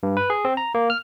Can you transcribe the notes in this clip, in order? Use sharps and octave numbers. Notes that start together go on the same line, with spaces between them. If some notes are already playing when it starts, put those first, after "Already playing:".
G2
B4
G#4
C4
A#5
A#3
F6